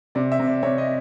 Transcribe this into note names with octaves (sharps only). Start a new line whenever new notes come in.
C3 D5
E5
C3
D5
C3 C#5
D#5